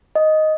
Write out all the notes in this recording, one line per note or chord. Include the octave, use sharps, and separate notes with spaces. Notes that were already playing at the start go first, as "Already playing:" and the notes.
D#5